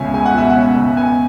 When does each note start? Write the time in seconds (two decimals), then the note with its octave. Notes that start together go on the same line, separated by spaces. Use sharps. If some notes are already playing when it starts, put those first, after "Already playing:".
Already playing: C#2 B2 G#3 C#4 E5 G#5
0.14 G#3 G#5
0.25 F#5
0.34 B2 E5
0.50 F#5
0.56 C#4
0.76 C#2
0.97 B3 G#5